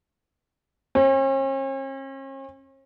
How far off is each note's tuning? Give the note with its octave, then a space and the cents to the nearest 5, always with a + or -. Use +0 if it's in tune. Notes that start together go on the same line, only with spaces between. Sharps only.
C#4 -45